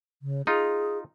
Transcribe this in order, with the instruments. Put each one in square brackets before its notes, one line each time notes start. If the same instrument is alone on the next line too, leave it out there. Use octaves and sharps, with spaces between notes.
[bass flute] C#3
[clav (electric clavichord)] D#4 F4 [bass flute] G#4